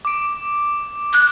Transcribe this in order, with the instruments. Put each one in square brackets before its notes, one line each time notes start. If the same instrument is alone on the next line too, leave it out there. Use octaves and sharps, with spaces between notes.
[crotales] D6 D7
[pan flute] F#6